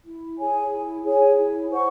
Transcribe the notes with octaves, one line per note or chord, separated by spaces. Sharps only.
E4
G#4 C#5 G#5
E4
G#4 C#5 G#5
E4
C5 F#5 C#6